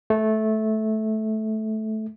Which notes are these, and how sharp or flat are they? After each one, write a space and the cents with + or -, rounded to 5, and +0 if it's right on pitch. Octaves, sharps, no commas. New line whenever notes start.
A3 -15